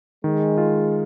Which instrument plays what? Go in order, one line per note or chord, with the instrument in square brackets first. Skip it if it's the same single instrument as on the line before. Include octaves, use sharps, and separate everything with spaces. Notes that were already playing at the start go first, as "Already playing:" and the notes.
[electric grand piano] D#3 [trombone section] G#3
[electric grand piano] F4